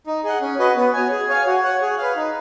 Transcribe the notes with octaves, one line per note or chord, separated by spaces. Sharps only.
D#4
G#4 D#5 F#5
C#4
F#4 B4 D#5
B3
F#4 C#5 G#5
G#4
C#5 F5 G#5
F#4
C#5 F#5
G#4
B4 F5
D#4